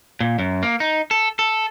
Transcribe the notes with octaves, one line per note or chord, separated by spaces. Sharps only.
A#2
F#2
A#3
D#4
A4
A4